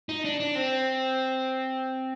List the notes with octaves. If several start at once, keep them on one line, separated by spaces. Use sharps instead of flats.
D#4
D4
D4
C4